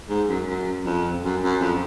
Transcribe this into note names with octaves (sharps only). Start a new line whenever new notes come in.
G#2
F#2
F#2
F2
F#2
F#2
F2